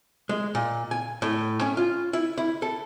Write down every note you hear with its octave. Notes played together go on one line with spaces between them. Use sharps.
G#3
A#2
G#5
A2
C#4
F4
E4
E4
A4